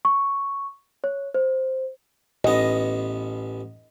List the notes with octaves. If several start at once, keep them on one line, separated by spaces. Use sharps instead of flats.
C#6
C#5
C5
A1 B3 D#5